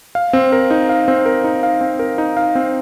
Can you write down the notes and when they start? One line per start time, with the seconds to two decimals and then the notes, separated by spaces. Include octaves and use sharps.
0.15 F5
0.33 C4
0.52 A#4
0.71 D#4
0.89 F5
1.08 C4
1.26 A#4
1.44 D#4
1.63 F5
1.81 C4
1.99 A#4
2.18 D#4
2.37 F5
2.55 C4